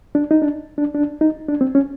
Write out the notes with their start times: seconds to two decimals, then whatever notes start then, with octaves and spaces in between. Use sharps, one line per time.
0.15 D4
0.31 D#4
0.42 D4
0.78 D4
0.95 D4
1.21 D#4
1.48 D4
1.61 C4
1.75 C#4